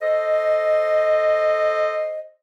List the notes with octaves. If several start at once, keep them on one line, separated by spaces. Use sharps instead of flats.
A4 C5 D#5